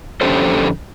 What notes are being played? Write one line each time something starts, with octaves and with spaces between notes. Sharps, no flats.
F2 D3 C#4 G4 A4 C5